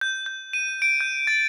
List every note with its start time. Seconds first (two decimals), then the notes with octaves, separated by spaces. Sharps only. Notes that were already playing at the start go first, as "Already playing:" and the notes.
0.01 G6
0.26 G6
0.53 D#7
0.82 D7
1.01 G6
1.27 A6